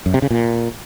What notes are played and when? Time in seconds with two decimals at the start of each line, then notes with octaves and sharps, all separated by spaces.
0.06 F#2
0.14 C3
0.22 C#3
0.30 A#2